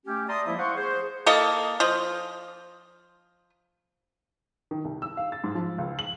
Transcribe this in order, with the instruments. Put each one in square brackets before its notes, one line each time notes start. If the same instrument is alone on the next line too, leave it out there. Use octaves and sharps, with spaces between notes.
[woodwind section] A3 C#4 G4
D5 E5 A5 A#5 C6 D#6
F3 G#3 A#3 E4
C5 F5 F#5 C6 C#6
G#4 C5
[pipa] A#3 A4 D#5 A5
F3 D#5
[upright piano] D#3
C2
E6
F5
A6
G#2
F3
C#2
F#7